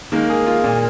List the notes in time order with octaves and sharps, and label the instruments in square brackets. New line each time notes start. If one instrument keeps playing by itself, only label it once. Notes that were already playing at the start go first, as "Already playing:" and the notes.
[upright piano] D#3 G#3 [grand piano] A#3
[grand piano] G#4
F4
A#2